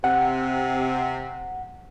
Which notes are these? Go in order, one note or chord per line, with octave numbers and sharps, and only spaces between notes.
C3 F#5